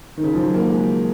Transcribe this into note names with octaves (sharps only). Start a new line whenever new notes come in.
D#3
C#3
F3
F#3
A#3
G#3